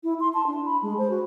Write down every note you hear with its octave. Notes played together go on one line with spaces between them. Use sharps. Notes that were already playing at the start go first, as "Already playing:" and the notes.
E4
C6
A5
D4
B5
G#3
C5
F#4